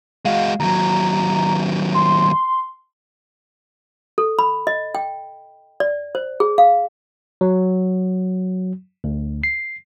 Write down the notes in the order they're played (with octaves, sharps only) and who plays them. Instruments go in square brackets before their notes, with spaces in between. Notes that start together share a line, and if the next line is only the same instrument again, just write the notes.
[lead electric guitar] G#3 F#4 [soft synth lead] F5
[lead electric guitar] D#2 F#3 [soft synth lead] A#5
[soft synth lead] C6
[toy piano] A4
B5
D#5
G5
D5
C5
G#4
F5
[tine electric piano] F#3
D2
C7